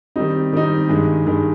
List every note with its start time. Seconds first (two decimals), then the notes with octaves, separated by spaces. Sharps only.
0.16 D#3 G3 C4 D#4
0.53 D#3 G3 C4 D#4
0.89 G2 D#3 G#3
1.26 G2 D#3 G#3